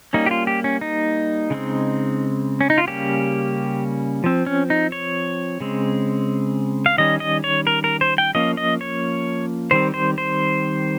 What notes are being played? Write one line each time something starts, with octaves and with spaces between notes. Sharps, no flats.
G3 A#3 C#4 D#4
G4
F4
G4
C#4
D#4
C#3 G#3 C4
C#4
D#4
F4
C#3 G3 A#3 C#4 G4
F3 C4
C#4
D#4
C#5
C#3 G#3 C4
F5
D#3 G3 C#4 D#5
D#5
C#5
A#4
A#4
C5
G5
F3 A#3 C#4 D#5
D#5
C#5
D#3 G3 C4 C5
C5
C5